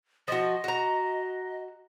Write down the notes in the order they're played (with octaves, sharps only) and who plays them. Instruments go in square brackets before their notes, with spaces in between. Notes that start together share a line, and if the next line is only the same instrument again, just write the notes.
[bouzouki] F3 F#4 [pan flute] D#5
[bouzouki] F#4 A#5